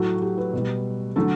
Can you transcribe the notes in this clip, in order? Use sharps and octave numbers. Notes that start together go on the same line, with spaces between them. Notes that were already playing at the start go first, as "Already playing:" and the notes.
Already playing: A2 F#3 A3 F#4
F#4
G4
B4
B2 G3
D3 F#3 A3 A4